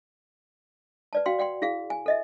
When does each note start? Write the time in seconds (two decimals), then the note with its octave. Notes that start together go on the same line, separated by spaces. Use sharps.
1.13 B4 D5 A5
1.26 F#4 F5 G5 C6
1.39 D5 F#5 G5 C6
1.62 E4 G#4 F5
1.90 G#5
2.06 A4 D#5 E5